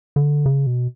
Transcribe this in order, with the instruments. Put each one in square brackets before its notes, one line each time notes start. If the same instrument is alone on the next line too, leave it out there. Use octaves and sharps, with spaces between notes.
[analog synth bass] D3
C#3
B2